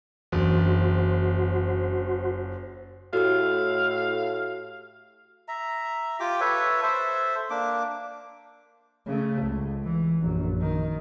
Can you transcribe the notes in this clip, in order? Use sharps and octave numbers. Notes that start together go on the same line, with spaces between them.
F#1 F#2 E3 D4 F#4 C5
A2 F#4 G4 F5
E5 A#5
F4 G4 G5 D6
A4 B4 C#5 E5
A4 C5 E5
A#3 D4 D6
C#3 A3
C#2
E3
A#1 F#2
D#3